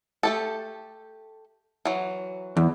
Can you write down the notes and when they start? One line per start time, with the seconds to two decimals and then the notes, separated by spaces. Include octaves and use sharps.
0.23 A3 G4 A4
1.85 E3 F#3
2.57 E2